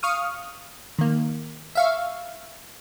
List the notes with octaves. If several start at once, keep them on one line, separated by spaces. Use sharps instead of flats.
F5 C#6 D#6 F6
D#3 A#3
E5 F5 C#6